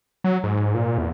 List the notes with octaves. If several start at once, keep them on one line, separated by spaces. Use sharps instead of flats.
F#3
G#2
A#2
E2